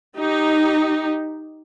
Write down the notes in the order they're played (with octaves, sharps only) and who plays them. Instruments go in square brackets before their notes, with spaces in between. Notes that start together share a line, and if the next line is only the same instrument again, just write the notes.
[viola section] D#4 G4